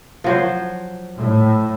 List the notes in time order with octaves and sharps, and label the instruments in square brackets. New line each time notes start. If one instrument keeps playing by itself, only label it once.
[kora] F3 F#3 C5
[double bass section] A2